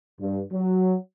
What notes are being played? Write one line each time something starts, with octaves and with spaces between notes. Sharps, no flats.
G2
F#3